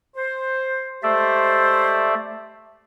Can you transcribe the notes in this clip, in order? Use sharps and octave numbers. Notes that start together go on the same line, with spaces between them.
C5
G#3 A3 G4 C5 D5 E5